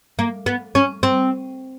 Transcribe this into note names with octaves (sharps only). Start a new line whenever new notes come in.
A#3
B3
C#4
C4